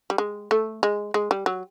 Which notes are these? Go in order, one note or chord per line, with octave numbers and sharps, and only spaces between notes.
G3
G#3
A3
G#3
G#3
G3
F#3